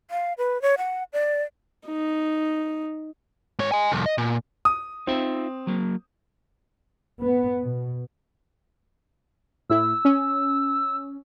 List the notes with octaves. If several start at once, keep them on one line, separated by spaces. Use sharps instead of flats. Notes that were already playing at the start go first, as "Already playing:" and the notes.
F5
B4
C#5
F#5
D5
D#4
G#2 C#5
D#5 G#5
C2 F2
D#5
A#2
D#6
C4 D#4 F4 E5
F#3 A#3
B3
B2
A2 E4 E6
C#4